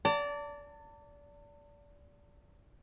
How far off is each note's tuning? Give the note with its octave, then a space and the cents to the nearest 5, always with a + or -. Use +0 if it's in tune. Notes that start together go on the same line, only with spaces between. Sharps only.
D5 -25 A5 +35